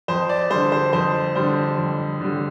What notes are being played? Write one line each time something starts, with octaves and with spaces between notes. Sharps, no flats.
F2 C5
D5
D3 G3 C5
C5
F2 C5
D3 G3 C5
F2
D3 G3